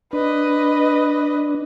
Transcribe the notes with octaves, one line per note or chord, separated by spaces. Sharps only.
D4 B4 D#5